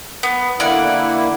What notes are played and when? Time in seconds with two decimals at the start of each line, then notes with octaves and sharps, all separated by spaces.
0.23 B3
0.60 D3 A#3 E4 D5 F#5